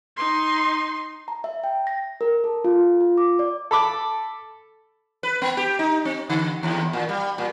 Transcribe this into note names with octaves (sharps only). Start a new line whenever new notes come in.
D#4 C6
A#5
E5
G5
A#6
A#4
A4
F4
F4
D6
D5
A4 B5 D6
B4
B3
G4
D#4
C4
D3
D#2
A#2
G3
A#2